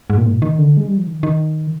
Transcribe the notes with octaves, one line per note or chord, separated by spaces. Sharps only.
G#2
A#2
G#2
A#2
D#3
D3
G#3
G3
F3
D#3
D#3